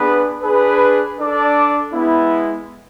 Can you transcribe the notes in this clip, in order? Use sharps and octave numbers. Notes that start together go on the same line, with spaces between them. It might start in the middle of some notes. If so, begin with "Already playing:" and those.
Already playing: B3 D4 G#4 B4
D4 G#4 B4
D4 A4 D5
G#3 B3 E4